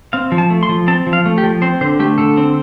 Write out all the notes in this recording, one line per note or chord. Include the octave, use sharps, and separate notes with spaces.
C4 F5
F3
A5
A3
C6
F3
C4 A5
F3
F5
A3
G4
F3
C4 C5
D3 C5
A3 G4
D3 A4
C4